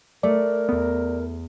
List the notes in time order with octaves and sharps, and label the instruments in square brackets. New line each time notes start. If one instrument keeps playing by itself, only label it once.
[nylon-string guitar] A3 [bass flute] A#4 [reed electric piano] D5
[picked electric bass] E2 B3